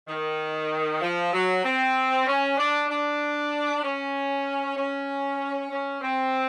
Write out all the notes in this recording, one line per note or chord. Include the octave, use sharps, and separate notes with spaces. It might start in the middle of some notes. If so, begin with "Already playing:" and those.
D#3
F3
F#3
C4
C#4
D4
D4
C#4
C#4
C#4
C4